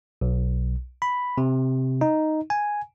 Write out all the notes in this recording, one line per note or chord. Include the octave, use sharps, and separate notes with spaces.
B1
B5
C3
D#4
G#5